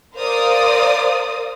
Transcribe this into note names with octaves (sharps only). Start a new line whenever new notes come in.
A#4 C5 D5 F5 D#6